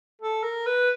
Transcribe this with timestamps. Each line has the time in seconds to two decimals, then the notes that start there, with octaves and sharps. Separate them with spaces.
0.22 A4
0.43 A#4
0.66 B4